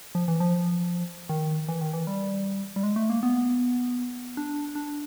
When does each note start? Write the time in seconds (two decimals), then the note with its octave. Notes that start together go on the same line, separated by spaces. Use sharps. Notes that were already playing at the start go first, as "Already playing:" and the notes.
0.15 F3
0.28 E3
0.40 F3
1.29 D#3
1.68 E3
1.81 D#3
1.94 E3
2.07 G3
2.76 G3
2.83 G#3
2.96 A3
3.10 A#3
3.23 B3
4.37 D4
4.75 D4